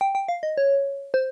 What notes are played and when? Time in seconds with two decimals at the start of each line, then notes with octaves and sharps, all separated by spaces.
0.01 G5
0.15 G5
0.29 F5
0.43 D#5
0.58 C#5
1.14 C5